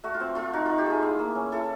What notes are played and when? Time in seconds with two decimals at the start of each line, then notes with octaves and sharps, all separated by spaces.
0.04 A3 F#4
0.14 F4
0.20 C4
0.35 A3 F4
0.53 D#4 F#4
0.66 D#4 F4
0.78 G4
0.86 A3 G#4
1.03 E4
1.19 A#3
1.35 C#4
1.52 E4 A4